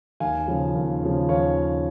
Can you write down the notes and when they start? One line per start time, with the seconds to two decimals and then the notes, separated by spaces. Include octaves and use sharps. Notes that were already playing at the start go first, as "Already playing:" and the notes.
0.20 D#2 F5 G#5
0.47 C#3 F3
0.75 D#2
1.03 C#3 F3
1.29 D#2 C#5 F5